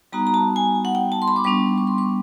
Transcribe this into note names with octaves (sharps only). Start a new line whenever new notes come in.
G3 B3 D#4 F#4 A#5
A#5
A5
G#5
F#5
G5
A5
C6
B5
D6
G3 B3 D4 C#6
C#6
C6
C#6